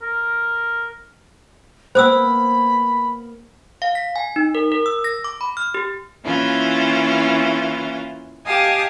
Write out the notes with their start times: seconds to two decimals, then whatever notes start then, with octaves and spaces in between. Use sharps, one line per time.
0.02 A#4
1.95 A#3 B3 C5 B5 D#6 E6
3.82 F5
3.95 B6
4.16 G#5
4.36 D#4
4.55 A#4
4.72 A#4
4.86 E6
5.04 A#6
5.24 D6
5.41 B5
5.57 F6
5.74 G4
6.25 E3 A#3 C#4 E4 F4
8.45 G4 D#5 F5 G#5 A5 D#6